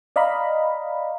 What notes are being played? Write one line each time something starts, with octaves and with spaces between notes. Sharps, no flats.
D5 D#5 F5 A#5 B5